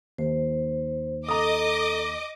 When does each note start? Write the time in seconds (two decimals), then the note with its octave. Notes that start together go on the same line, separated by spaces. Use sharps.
0.18 D#2 C5
1.29 A4 D#5 A#5 D6 D#6